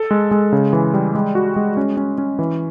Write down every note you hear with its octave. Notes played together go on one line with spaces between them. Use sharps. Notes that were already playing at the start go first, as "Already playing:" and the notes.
Already playing: A4
G#3
G#3
C#3
E3
G3
G#3
F#4
G#3
C#4
C#4
C#4
E3